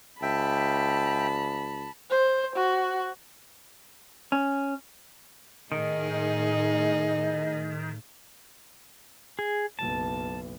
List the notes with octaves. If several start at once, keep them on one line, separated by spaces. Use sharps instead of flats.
C#2 E5 G5 A5 B5
C5
F#4
C#4
A2 D#3 D#4 G#4 D#5
G#4
F#1 B1 A5